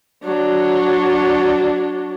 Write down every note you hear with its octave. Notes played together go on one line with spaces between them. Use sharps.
F#3 D4